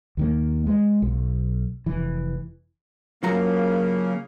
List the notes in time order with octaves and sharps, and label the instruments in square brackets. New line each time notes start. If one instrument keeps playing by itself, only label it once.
[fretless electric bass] D#2 D#3 A#3
G#3
B1
F1 E3
[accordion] C#3 A#3 [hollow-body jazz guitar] F#3 F4 A#5